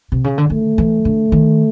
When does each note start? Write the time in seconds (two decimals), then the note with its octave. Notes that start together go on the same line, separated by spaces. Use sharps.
0.12 C3
0.24 C#3
0.38 D3
0.50 D#3 A3
0.78 E3
1.05 D3
1.32 D#3